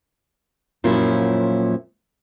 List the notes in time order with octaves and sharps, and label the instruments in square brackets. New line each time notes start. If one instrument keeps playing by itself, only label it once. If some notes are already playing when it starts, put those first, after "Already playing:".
[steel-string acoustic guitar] F#2 A#2 F3 F#3 C#4 E4